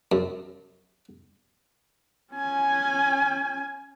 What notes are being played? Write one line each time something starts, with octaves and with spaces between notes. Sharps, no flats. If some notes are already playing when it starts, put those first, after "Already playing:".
F#2
C#4 G#5